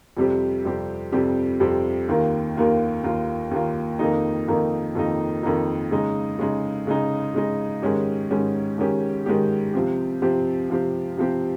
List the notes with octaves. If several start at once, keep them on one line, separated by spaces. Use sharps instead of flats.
F2 C3 G3 C4 G4
F2 C3 G3 C4 G4
F2 C3 G3 C4 G4
F2 C3 G3 C4 G4
D#2 D#3 A#3 F4
D#2 D#3 A#3 F4
D#2 D#3 A#3 F4
D#2 D#3 A#3 F4
F2 D#3 A#3 D#4
F2 D#3 A#3 D#4
F2 D#3 A#3 D#4
F2 D#3 A#3 D#4
C#3 G#3 D#4
C#3 G#3 D#4
C#3 G#3 D#4
C#3 G#3 D#4
G#2 D#3 G#3 C#4 G4
G#2 D#3 G#3 C#4 G4
G#2 D#3 G#3 C#4 G4
G#2 D#3 G#3 C#4 G4
C3 F3 C4 G4
C3 F3 C4 G4
C3 F3 C4 G4
C3 F3 C4 G4